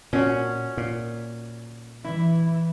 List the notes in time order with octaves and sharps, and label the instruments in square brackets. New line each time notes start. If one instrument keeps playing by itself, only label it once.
[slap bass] A#2 [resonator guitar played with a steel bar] C#4 F#4
[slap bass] A#2
[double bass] E3 [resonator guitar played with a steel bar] E4